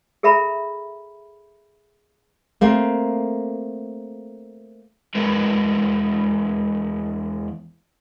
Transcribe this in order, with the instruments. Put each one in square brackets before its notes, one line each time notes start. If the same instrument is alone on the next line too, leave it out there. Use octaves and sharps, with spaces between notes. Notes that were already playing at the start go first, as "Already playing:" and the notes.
[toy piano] G#4 A4 E5 A#5 B5
[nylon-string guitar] A3 A#3 C4
[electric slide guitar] E2 G#3 E4 A#4 B4